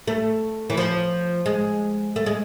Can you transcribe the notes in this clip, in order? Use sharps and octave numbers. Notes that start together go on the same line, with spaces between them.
A3
E3
F3
G#3
A3
G#3